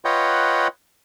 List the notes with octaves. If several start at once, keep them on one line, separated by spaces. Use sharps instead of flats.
F4 B4 C#5 D#5 F#5 G5